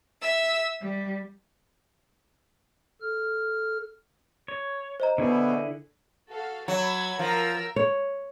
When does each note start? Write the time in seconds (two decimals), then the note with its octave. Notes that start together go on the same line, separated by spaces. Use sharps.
0.21 E5 E6
0.82 G3
3.02 A4 F6
4.48 C#5
5.00 C5 D#5 A#5
5.18 B2 D3 E4 G#4
6.29 F#4 A4 F5
6.68 F#3 B5 E6 G#6
7.19 F3 A#4 A#5 E6
7.76 C#5